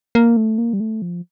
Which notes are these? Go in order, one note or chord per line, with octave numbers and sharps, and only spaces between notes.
A#3
A3
A#3
G3
A3
F3